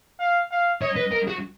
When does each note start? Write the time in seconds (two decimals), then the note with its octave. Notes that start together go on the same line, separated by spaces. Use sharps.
0.19 F5
0.51 F5
0.81 C#5 D#5
0.96 B4
1.12 A#4
1.28 F#4